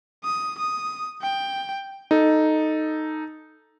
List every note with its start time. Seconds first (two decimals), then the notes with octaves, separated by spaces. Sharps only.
0.25 D#6
0.58 D#6
1.22 G5
2.11 D#4 A4